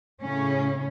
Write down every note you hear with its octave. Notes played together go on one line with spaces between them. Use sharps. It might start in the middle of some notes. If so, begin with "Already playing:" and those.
A2 C#3 C#4